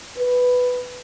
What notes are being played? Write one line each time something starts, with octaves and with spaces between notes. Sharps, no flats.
B4